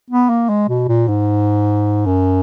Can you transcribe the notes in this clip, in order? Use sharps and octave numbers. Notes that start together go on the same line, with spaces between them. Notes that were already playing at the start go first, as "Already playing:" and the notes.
B3
A#3
G#3
B2
A#2
G#2
F#2